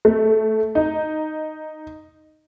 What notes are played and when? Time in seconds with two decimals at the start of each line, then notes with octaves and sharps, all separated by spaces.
0.05 A3
0.75 D#4